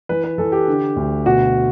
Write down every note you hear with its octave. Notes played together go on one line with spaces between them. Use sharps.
E3 B4
B4
E3 A4
G4
D3
D2
B2 F#4